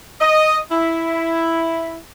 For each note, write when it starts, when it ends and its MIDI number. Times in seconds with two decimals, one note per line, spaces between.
0.21 0.58 75
0.71 1.96 64